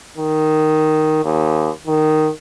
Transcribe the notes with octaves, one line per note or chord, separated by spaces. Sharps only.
D#3
D#2
D#3